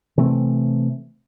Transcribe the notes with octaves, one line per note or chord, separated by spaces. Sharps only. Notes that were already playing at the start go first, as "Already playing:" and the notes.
C3 E3 A3 C4